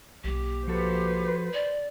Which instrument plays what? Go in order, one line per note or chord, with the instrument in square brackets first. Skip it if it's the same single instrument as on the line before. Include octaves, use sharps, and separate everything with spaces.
[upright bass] B1 A#3 [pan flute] G4
[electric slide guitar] F3 F#4 A4 [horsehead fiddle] B4 C5
[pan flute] D5